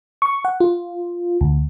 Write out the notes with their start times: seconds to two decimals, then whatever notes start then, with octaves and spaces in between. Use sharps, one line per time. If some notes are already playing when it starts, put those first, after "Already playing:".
0.22 C#6
0.45 F#5
0.60 F4
1.41 D2